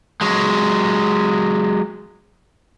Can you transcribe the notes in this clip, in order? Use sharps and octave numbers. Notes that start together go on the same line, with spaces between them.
F#3 G#3